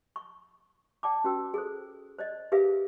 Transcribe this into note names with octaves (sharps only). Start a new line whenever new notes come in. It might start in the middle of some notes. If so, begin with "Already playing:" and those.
C#6
D5 G5 A5 D6
C#4 F#4 B4 G5 E6
G#4 A4 C5
C5 D5 D#5
G4 G#4 A#4 B4 E5 F5